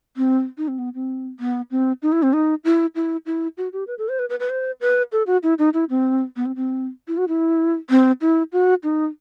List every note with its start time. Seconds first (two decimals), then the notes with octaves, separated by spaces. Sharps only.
0.17 C4
0.58 D#4
0.68 C4
0.79 B3
0.94 C4
1.40 B3
1.71 C4
2.02 D#4
2.12 E4
2.23 C4
2.33 D#4
2.65 E4
2.95 E4
3.26 E4
3.57 F#4
3.73 G4
3.87 B4
3.98 A4
4.09 C5
4.19 B4
4.30 B4
4.40 B4
4.50 C5
4.81 B4
5.12 A4
5.27 F#4
5.43 E4
5.59 D#4
5.74 E4
5.90 C4
6.36 B3
6.46 C4
6.56 C4
7.08 E4
7.18 F#4
7.28 E4
7.90 C4
8.21 E4
8.52 F#4
8.83 D#4